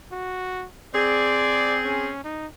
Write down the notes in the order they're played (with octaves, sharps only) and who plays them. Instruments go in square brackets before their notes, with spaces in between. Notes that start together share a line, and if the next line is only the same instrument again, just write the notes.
[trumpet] F#4
[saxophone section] C4 G#4 [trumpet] D5
[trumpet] C#4
D#4